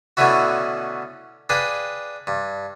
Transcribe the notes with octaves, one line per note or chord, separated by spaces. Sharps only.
B2 D3 A3 C#4 E4 F#4
D4 G#4 B4 F5 G5
G2